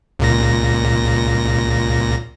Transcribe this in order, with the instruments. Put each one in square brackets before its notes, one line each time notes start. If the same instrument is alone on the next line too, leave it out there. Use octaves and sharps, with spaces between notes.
[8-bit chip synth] C#2 A#2 A#6